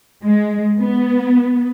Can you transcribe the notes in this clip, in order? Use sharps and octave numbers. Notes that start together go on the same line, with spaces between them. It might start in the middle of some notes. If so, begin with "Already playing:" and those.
G#3
B3